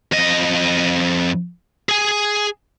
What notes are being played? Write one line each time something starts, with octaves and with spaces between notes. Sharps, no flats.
F2 D#5
G#4 G#5